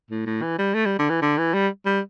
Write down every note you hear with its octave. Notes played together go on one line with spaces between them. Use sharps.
A2
A2
E3
G3
A3
G3
D3
E3
D3
E3
G3
G3